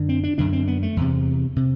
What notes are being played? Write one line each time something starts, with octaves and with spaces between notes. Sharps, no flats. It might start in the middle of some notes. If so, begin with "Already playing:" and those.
Already playing: F#2 D3
C4
D4
F#2 D3 D4
C4
B3
A3
E2 C3
C3